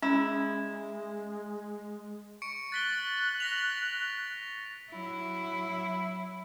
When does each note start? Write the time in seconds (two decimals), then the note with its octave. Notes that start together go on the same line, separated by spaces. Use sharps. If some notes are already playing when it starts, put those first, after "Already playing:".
0.02 G#3 C#4 E4
2.42 C#6 C#7 D7
2.72 F#6 A6 B6 G7
3.40 A#6 B6 F7
4.91 F#3 E4